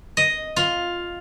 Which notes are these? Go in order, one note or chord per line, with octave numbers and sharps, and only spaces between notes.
D#5
F4